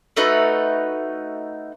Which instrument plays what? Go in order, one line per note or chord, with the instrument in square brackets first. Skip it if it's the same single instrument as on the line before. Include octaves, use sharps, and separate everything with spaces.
[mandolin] A3 D#4 F#4 B4